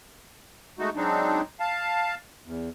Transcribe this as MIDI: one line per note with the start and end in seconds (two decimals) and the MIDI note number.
0.79 0.90 56
0.79 0.90 57
0.79 0.90 63
0.79 0.90 66
0.96 1.41 54
0.96 1.41 56
0.96 1.41 60
0.96 1.41 62
0.96 1.41 63
1.60 2.15 77
1.60 2.15 81
2.45 2.69 40